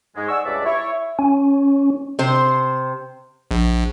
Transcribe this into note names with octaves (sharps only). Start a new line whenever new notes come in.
G#2 G#3
D5 F#5 G#5 C#6 E6
C#2 G2 C#4 D4 D5 E5
E4 C#5
C#4
C3 C5
A#1